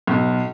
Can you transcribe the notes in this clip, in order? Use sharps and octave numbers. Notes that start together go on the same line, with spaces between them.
B1